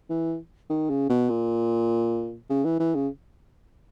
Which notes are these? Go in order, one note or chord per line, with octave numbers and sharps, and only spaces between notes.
E3
D#3
C#3
B2
A#2
C#3
E3
E3
C#3